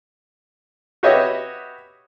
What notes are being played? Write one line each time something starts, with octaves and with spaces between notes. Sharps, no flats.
F#4 G4 B4 C#5 D#5 E5